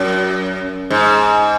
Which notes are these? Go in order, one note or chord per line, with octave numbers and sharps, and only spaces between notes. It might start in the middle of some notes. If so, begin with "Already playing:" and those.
Already playing: F#2
G#2